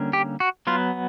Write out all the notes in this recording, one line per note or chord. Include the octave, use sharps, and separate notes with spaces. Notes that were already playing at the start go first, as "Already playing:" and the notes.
Already playing: D3 G3 A#3 C#4
G4
F#4
F#3 B3 F4